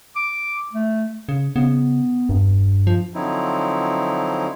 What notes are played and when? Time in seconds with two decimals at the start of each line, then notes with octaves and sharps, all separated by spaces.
0.16 D6
0.73 A3
1.29 C#3
1.56 C#3 B3
2.29 E1 G2
2.87 F3
3.14 D3 F3 F#3 C4 D#4 E4